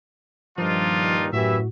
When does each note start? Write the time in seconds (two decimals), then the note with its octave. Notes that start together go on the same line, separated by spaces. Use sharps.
0.58 G2 A#2 D#3 F3 D4 D#4 F4
1.33 F#2 A2 E3 F#4 G4 E5